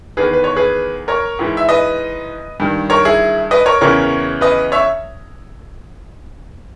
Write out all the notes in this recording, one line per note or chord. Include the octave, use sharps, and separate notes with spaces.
E2 D#3 G#4 B4
B4
C#5
G#4 B4
A#4 C#5
G#2 E3
E5
B4 D#5
G2 D#3
A#4 C#5
E4 G#4
B4 D#5
A#4 C#5
E2 C#3 E3 A#4 C#5
B4 D#5
C#5 E5